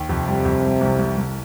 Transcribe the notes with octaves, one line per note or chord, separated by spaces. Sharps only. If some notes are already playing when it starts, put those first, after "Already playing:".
Already playing: D#2
F2 C3
G3
F2
G3
C2
C2
C2